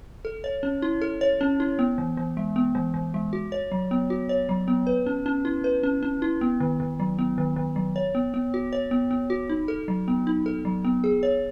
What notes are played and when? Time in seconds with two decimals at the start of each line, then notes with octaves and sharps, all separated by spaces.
0.25 A4
0.44 C#5
0.63 C#4
0.82 E4
1.02 A4
1.21 C#5
1.41 C#4
1.60 E4
1.79 B3
1.98 E3
2.17 E3
2.37 G#3
2.56 B3
2.75 E3
2.94 E3
3.14 G#3
3.33 F#4
3.52 C#5
3.72 F#3
3.91 B3
4.10 F#4
4.29 C#5
4.49 F#3
4.68 B3
4.87 B4
5.06 C#4
5.26 C#4
5.45 E4
5.64 B4
5.83 C#4
6.03 C#4
6.22 E4
6.41 B3
6.60 D#3
6.80 D#3
7.00 F#3
7.19 B3
7.38 D#3
7.56 D#3
7.76 F#3
7.96 C#5
8.15 B3
8.34 B3
8.54 F#4
8.73 C#5
8.91 B3
9.11 B3
9.30 F#4
9.49 D#4
9.68 A4
9.88 F#3
10.08 B3
10.27 D#4
10.46 A4
10.65 F#3
10.85 B3
11.04 G#4
11.23 C#5